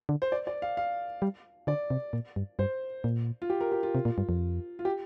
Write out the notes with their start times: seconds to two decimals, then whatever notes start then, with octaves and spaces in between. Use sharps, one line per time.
0.09 D3
0.22 C5
0.32 D5
0.47 D5
0.62 F5
0.77 F5
1.22 G3
1.67 D3 D5
1.90 C3
2.13 A#2
2.36 G2
2.59 G2 C5
3.04 A#2
3.42 F4
3.50 G4
3.61 A#4
3.72 G4
3.83 F4
3.95 C3
4.05 A#2
4.18 G2
4.29 F2
4.79 F4
4.85 G4